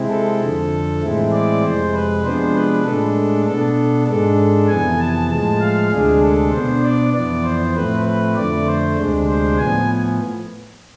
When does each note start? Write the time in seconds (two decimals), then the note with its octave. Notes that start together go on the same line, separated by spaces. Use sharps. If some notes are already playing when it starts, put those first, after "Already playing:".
Already playing: C3 G#3 C4 E4
0.10 A4
0.41 F2 D3 F3
1.02 A2 E3 G#3 C4 E4
1.32 D5
1.63 F2 C3 G#3 C5
1.94 B4
2.24 C3 F3 G#3 B3 D4 C5
2.55 B4
2.85 A2 G#3 D4 A4
3.46 B2 B3 D4 A4
4.07 G#2 G#3 D4 A4
4.68 F2 C3 E3 B3 G#5
4.99 A5
5.30 A2 F3 G#3 A5
5.61 F5
5.91 D2 C3 G#3 D4 G#4
6.22 A4
6.52 B2 B3 D4 C5
6.83 D5
7.14 F2 E3 B3 D5
7.43 C5
7.75 A2 F3 A3 C4 B4
8.05 B4
8.35 F2 D3 A3 D5
8.67 C5
8.97 D2 C3 G#3 D4
9.27 C5
9.58 A2 F3 B3 G#5